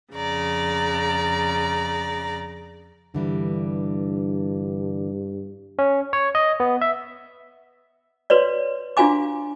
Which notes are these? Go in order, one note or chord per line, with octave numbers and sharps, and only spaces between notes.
F2 C#3 D5 A#5
G2 D3 E3 G3
C#4
C#5
D#5
B3
E5
F#4 B4 C#5 D5
D4 F4 F#4 F5 G#5 D6